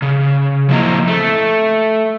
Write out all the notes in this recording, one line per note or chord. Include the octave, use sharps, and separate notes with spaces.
C#3
F3 A#3 C4 E4 D#5 A#5
A3